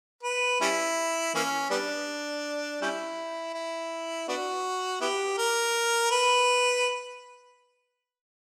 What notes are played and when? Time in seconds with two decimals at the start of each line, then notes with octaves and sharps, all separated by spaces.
0.23 B4
0.61 G3 C#4 E4
1.35 E3 A#3 C#4
1.70 G3 B3 D4
2.82 G3 C#4 E4
3.54 E4
4.28 B3 D4 F#4
5.01 B3 E4 G4
5.37 A#4
6.11 B4